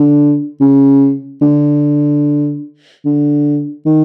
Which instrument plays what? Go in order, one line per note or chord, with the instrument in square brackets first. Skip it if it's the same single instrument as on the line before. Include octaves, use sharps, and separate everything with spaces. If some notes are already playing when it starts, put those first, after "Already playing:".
Already playing: [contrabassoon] D3
C#3
D3
D3
D#3